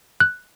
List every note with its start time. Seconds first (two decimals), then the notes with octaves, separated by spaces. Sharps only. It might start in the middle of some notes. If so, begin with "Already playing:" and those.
0.20 F#6